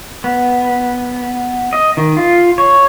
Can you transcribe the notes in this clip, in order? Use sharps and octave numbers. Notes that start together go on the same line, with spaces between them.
B3
D#5
D#3
F4
C#5